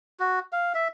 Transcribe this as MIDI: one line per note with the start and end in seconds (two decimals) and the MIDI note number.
0.20 0.39 66
0.52 0.73 77
0.74 0.88 76